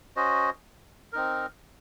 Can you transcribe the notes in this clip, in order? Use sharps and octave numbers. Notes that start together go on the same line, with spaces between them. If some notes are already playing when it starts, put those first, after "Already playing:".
C#4 F#4 C5 D#5
C4 D#4 A#4